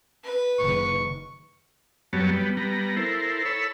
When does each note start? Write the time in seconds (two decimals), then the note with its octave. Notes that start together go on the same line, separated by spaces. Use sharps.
0.23 B4
0.59 F#1 D#3 C#6
2.13 F#2 F#3 G3 B3 C#5 A5
2.33 G3 B3
2.57 G3 B3 A#5
2.96 E4 A4 A#4 C5
3.45 A4 C#5 B5 E6